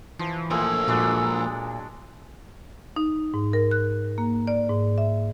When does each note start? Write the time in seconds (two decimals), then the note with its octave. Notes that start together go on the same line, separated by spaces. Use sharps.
0.19 E3 F3
0.51 A2 F3 A#3 F4 G#4 E6
0.88 A#2 F#3 G#3 D4
2.96 D#4
3.34 G#2
3.53 A#4
3.71 F#6
4.18 A#3
4.47 D5
4.70 G#2
4.98 E5